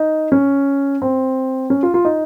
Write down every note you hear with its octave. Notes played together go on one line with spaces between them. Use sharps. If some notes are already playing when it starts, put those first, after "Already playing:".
Already playing: D#4
C#4
C4
C#4
F4
F4
D#4